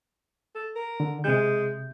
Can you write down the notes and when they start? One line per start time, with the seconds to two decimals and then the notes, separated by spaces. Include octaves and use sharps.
0.55 A4
0.75 A#4
1.00 D3
1.24 C3 G#3 G6